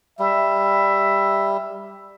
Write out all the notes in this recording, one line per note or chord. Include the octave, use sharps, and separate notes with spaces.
G3 E5